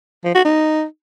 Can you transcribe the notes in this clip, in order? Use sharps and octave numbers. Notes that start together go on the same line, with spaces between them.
F3
F#4
D#4